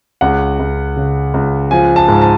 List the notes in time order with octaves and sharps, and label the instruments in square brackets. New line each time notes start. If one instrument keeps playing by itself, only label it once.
[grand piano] C#2 F#5
C#2
C#3
C#2
F3 G#5
A5
G#2
A5